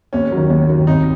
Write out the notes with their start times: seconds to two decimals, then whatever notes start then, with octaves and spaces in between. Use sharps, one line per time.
0.13 D#2 C#4
0.32 D#3 F#3
0.50 D#2
0.69 D#3 F#3
0.87 C2 D#4